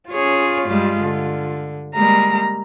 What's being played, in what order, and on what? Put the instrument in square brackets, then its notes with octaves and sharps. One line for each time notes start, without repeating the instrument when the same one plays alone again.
[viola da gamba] C#4 G#4 C#5 [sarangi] F4
[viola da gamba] G2 G3 G#3
D3
[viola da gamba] G3 G#3 A#3 [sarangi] A#5